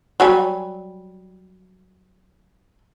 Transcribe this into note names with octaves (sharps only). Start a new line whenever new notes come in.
F#3 G3 G#5